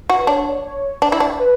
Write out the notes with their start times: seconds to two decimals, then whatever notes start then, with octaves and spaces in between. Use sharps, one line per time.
0.10 F#4
0.17 B4
0.27 D4 C#5
0.65 C#5
1.02 D4 D5
1.12 E4
1.20 D4
1.39 B4